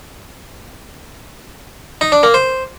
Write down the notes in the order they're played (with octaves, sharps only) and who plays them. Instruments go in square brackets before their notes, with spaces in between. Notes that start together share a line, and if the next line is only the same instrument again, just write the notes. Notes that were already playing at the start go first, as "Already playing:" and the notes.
[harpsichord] D#4
D4
A#3
C5